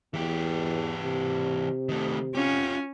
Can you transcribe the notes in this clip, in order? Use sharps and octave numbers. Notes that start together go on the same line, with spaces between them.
E2 E3 G4
C3
D#3 A3
C#4 F4 G4